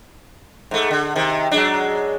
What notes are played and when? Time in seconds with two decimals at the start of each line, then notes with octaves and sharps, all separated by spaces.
0.71 G#2 A3
0.91 D3
1.16 C3 D#3
1.51 F#3 G#3 D4